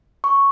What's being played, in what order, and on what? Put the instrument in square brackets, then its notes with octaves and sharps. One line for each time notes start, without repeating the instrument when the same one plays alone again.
[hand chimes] C#6